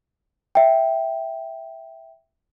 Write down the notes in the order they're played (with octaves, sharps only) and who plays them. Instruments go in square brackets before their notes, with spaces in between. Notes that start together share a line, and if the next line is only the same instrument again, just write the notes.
[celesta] E5 G5